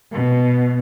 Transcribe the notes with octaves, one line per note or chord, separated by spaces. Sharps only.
B2